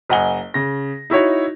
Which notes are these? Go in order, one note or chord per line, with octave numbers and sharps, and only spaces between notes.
F#1 D#5 F#5 G#5 G7
C#3 A#6
D#4 E4 F#4 C#5